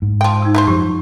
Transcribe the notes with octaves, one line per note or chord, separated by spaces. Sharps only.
G#2
F3 G5
D#4 E6
E3 F#3 C5
F#2 F3 G4